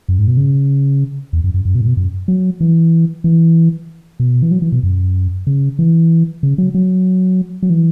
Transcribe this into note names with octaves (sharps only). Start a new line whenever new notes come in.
F#2
G#2
B2
C#3
E2
F#2
F#2
F#2
B2
G#2
B2
F#2
F#3
E3
E3
B2
E3
F#3
E3
B2
F#2
C#3
E3
C#3
F#3
F#3
F#3
E3